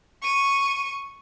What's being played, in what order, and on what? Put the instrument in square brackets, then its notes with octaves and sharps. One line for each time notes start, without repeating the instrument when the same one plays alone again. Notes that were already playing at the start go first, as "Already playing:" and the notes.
[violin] C#6 D#7